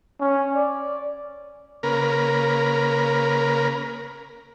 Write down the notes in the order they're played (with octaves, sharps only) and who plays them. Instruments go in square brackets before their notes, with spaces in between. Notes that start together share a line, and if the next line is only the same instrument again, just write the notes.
[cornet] C#4
D5
[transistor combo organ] C#3 A#3 A#4 B4